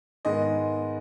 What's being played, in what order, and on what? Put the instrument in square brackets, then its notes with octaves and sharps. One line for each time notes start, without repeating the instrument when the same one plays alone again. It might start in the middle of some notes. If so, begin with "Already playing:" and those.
[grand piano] G#2 D#3 G#3 B3 D#5